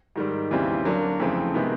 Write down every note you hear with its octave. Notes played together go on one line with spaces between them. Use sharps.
G#2 D#3 G3
D#2 C#3 E3 G3 C4
D3 F#3 A#3 D4
F2 C#3 E3 A3 C4
C3 D#3 G#3 B3